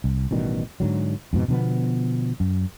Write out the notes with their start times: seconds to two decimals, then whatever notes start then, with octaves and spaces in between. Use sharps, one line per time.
0.04 C2
0.31 A1 B2 D#3 G3
0.80 G#2 D3 F#3
1.33 F2 G#2 B2
1.48 B2 D3 F3 B3
2.40 F#2